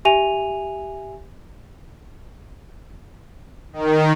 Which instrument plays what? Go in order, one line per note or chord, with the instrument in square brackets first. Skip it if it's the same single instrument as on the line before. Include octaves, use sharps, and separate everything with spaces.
[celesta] G4 E5 G#5 D#7 F7
[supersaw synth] D#3